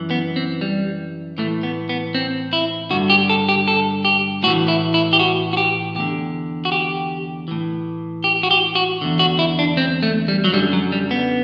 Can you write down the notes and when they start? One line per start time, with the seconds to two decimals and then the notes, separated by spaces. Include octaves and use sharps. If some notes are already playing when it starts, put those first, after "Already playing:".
Already playing: F#2 E3
0.11 B3
0.36 C4
0.61 G3
1.38 A2 E3 A3
1.63 B3
1.89 B3
2.15 C4
2.53 E4
2.90 G2 D3 F#4
3.10 G4
3.30 A4
3.49 G4
3.68 A4
4.05 G4
4.43 A2 F#4
4.48 E3
4.68 E4
4.94 E4
5.13 G4
5.19 F#4
5.53 F#4
5.57 G4
5.95 E2 D3 G4
6.65 F#4
6.72 G4
7.48 A2 E3
8.24 G4
8.43 F#4
8.51 G4
8.75 F#4
9.01 E2 D3
9.19 F#4
9.39 E4
9.59 D4
9.77 C4
10.03 A3
10.28 G3
10.44 F#3
10.53 F#2 D3 G3
10.73 F#3
10.92 G3
11.11 B3